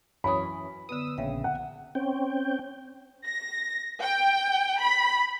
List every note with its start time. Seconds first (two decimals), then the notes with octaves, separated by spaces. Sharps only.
0.24 F#2 E3 C#4 C#5 B5 D#6
0.89 D3 B3 B4 D#6 E6
1.18 A#1 C#3 E5 G5
1.44 F#5
1.95 C4 C#4 G5
3.25 A#6
4.02 G5
4.80 B5